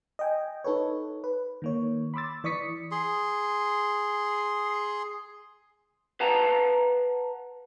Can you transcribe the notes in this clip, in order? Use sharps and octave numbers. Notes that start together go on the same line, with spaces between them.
D#5 G5 G#5
D#4 A4 B4 C#5
B4
D#3 A#3 C#5
B5 C6 D6 E6 A6
E3 D5 C#6 D#6 B6 C#7
G#4 C6
B4 F5 F#5 A5 A#5